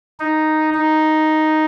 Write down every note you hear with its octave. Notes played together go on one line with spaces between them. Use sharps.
D#4
D#4